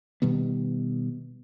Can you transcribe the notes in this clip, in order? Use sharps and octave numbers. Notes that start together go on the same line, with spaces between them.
B2 D#3 G3 B3